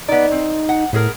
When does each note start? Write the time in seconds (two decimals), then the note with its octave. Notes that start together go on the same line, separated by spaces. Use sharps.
0.08 B3 D#4 D5
0.32 C4
0.69 F#5
0.93 A2 B3 G#4 A#4